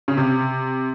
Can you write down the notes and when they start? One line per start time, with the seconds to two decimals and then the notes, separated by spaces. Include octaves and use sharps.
0.08 C#3
0.17 C3